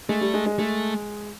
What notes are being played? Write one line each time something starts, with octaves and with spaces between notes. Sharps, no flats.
G#3 A3
G3
G#3
G#3
G#3 A3